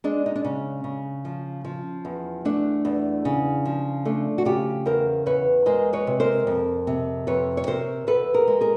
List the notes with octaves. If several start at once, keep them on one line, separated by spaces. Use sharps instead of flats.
G#3 D4
D#4
D4
C#3 C#4
C#3
F3
F3
E2
A3 D4
E2
C#3
F3
A3 D4
F#4
C#3 F4 G4
E2 A#4 C5
E2 B4 C#5
G#3 A#4 C5
B4 C#5
C3
A#4 C5
F2
C3
F2 B4 C#5
C#5
C3 A#4 C5
E2 A4 B4
G#4 A#4
G#3
G#4 A#4